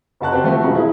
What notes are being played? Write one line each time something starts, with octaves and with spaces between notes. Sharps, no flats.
F#1 F#4 A5 F#6
C4 G4
F3 A3 C4 F#4
E1
E4 G#4